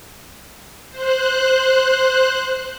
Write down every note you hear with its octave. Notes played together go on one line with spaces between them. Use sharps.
C5 F#6